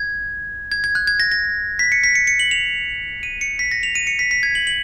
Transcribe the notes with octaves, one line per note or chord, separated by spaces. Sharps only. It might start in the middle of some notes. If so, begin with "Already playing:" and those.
Already playing: G#6
G#6
G#6
F#6
G#6
A#6
A#6
B6
C#7
B6
C#7
C#7
F#7
F7
D#7
C#7
B6
A#6
F7
D#7
C#7
B6
B6
G#6
F#7
F#7